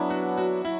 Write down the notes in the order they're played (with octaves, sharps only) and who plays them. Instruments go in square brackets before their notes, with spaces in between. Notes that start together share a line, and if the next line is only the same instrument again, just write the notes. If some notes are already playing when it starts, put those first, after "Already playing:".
Already playing: [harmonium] F#3 B3 D4 [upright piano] E4
[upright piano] F#4
F#4
[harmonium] F#3 [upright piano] E4